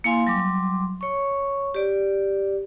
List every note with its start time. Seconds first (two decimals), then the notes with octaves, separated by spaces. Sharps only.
0.04 A#3 E4 F5 G#5 C6
0.27 F#3 G3 C6 D6
1.01 C#5 C#6
1.74 G4 D5